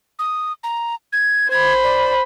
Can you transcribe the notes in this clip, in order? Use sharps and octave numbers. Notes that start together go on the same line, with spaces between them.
D#6
A#5
G#6
C5 B5 G#6
D5